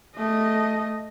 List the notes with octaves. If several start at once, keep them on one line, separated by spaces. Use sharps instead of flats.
A3 D#5